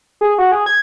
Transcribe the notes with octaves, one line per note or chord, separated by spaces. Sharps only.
G#4
F#4
G#4
G#6